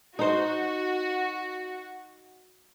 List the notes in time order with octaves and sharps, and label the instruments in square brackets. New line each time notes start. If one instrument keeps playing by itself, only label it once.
[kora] D#4 C5 [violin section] F#4